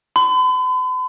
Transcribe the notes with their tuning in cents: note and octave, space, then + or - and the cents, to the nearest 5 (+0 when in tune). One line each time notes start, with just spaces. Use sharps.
B5 +45